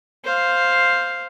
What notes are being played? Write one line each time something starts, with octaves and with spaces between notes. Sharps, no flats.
C5 F5